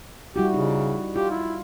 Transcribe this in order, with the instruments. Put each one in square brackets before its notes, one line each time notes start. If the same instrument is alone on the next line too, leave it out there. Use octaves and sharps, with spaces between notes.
[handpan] G3 E4 F#4 [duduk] G4
[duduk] C#3 [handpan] D#4
[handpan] F4 [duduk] G4
[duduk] E4